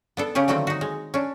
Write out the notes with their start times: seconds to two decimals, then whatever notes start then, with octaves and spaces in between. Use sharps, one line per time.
0.17 B3 D4 A4
0.35 C#3 C#4 G4 G#4
0.48 D3 D#3 F#3 A3 A#3 C4
0.67 D#4 F#4
0.81 G#3
1.14 C#4 D4